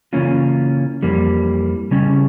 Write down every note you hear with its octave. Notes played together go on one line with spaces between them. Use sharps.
C#3 E3 A#3 C#4 F4
F2 E3 G3 A#3
C#3 G3 C#4